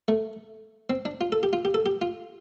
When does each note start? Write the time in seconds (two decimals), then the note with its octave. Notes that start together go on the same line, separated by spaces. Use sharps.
0.08 A3
0.90 C4
1.05 D4
1.21 F4
1.32 A4
1.43 G4
1.53 F4
1.65 G4
1.74 A4
1.86 G4
2.02 F4